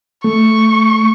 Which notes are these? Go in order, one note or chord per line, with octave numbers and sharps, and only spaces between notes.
A3 C#6